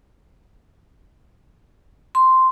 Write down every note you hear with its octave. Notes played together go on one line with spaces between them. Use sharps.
C6